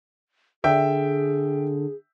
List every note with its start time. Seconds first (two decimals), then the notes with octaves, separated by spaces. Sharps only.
0.64 D3 G#4 E5 G5